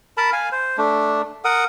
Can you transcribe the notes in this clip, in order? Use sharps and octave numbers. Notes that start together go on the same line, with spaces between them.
A#4 A5 B5
F5 G#5
C5
A3 D4
A#4 F#5 D#6